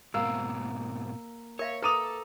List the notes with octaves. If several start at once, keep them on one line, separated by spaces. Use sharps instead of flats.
G#2 B2 A#3 C4 E6
A#4 C#5 E5 F5
A4 B4 A#5 D6 D#6 D#7 F7